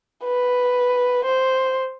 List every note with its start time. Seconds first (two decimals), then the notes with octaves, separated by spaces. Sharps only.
0.24 B4
1.25 C5